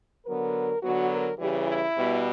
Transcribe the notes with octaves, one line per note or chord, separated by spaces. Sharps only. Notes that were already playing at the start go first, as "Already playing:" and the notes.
D3 F#3 B3 A#4
D3 F#3 B3 F#4
A#4
C#3 E3 G3 G4
E4
B2 G3 B3